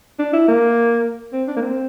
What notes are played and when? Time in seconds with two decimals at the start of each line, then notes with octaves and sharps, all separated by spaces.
0.19 D4
0.33 E4
0.48 A#3
1.33 C4
1.48 D4
1.56 A#3
1.62 C4